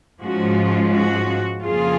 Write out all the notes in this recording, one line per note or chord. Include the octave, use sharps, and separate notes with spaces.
G#2 F3 G#3 C#4 F4 F#4
F#4
F2 C#3 F3 A#3 F4 G#4